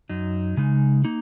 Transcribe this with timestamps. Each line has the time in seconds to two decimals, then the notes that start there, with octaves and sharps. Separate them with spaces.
0.09 F#2 F#3 D#4
0.57 C#3 G#3 D#4
1.05 A#3 D#4